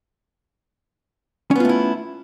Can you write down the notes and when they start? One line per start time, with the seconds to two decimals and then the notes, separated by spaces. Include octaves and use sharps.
1.51 C#4
1.56 B3
1.60 F4
1.65 A3
1.69 E4